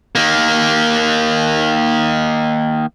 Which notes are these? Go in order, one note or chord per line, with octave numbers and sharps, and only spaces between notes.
D#3 A#3